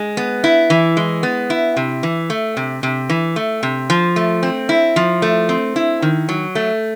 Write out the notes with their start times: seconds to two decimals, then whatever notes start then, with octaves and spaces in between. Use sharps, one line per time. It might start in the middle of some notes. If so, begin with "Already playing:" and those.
Already playing: G#3
0.17 B3
0.44 E4
0.70 E3
0.97 G#3
1.23 B3
1.50 E4
1.77 C3
2.03 E3
2.30 A3
2.57 C3
2.83 C3
3.10 E3
3.36 A3
3.63 C3
3.90 F3
4.16 A3
4.43 C4
4.69 E4
4.96 F3
5.22 A3
5.49 C4
5.76 E4
6.02 D#3
6.29 F#3
6.55 A3